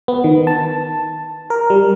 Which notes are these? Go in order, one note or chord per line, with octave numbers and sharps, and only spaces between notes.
B3
D#3
A5
A#4
G3